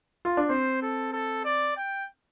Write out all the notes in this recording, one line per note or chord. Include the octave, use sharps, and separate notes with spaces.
F4
D4
C4 C5
A4
A4
D5
G5